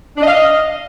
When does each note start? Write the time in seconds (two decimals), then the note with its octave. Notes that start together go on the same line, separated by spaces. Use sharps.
0.17 D4
0.22 D#5
0.27 F5
0.32 D#5